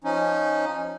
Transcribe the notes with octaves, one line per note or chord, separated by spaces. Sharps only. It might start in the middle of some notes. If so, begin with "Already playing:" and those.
F3 C#4 D#4